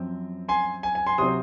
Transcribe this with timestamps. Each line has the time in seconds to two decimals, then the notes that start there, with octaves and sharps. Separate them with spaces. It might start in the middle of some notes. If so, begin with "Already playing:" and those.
Already playing: F#2 F3 C4
0.49 G#5 C6
0.83 G#5
0.95 G#5
1.07 G#5 C6
1.18 C3 F#3 C4 C6 D#6